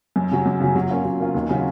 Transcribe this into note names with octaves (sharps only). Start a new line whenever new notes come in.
F#2
C#3 F#3
F#2
C#3 F#3
F#3
A#3 C#4 F4
F#3
A#3 C#4 F4
D#2
C#3 F#3 C#4 F4